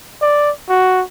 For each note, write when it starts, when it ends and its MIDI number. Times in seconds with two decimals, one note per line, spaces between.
0.22 0.51 74
0.69 1.03 66